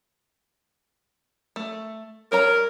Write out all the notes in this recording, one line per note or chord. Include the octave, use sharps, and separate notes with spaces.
A3
G3 A#4 C#5 A#5